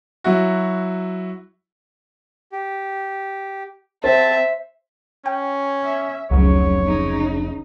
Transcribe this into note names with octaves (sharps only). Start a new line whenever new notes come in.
F#3 E4 F#4
G4
C4 C5 E5 A5
C#4 G5
E5
F1 C#2 C#3 F#3 C#5
C#3 D#4